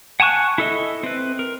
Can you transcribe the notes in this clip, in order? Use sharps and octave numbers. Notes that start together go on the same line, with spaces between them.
F#5 G#5 A5 C#6 F#6
E4 A4 D#5 E5
C4 B4
A#4